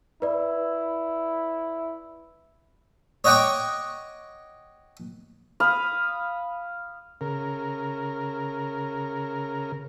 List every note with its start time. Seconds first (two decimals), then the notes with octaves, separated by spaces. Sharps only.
0.22 E4 B4 D5
3.24 C#5 D#5 F#5 G5 C#6 D6
5.60 F5 B5 D#6
7.21 C#3 A#4